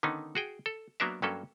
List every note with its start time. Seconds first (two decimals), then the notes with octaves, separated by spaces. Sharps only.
0.03 D3 D#3 B3 C#4 D#4
0.35 F#4 G#4 G5
0.66 A4
1.00 F#3 A#3 B3 D4 A#4 E5
1.22 G2 F#3 A#3 C#4 A4